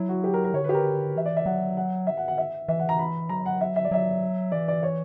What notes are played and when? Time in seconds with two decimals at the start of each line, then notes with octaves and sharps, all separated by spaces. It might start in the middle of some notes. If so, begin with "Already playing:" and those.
Already playing: F#3 E4
0.09 F#4
0.24 G4
0.34 A#4
0.44 A#4
0.54 D3 C#5
0.64 B4
0.69 G4
0.74 A#4
1.16 E3 E5
1.26 D5
1.37 E5
1.46 F#3 F#5
1.77 F#5
2.07 E5
2.17 F#5
2.28 F#5
2.38 E5
2.68 E3 E5
2.79 F#5
2.89 A#5
2.99 B5
3.29 F#3 A#5
3.46 F#5
3.61 E5
3.76 E5
3.85 D5
3.91 F#3 E5
4.52 E3 D5
4.68 D5
4.83 C#5